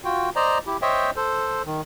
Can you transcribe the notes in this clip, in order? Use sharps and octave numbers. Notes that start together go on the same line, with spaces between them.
F4 F#4 G5
C5 D5 D#5 A#5
E4 G4
C5 C#5 D#5 E5 G5
A4 C5
D#3